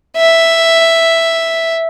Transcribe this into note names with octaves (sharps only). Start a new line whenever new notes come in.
E5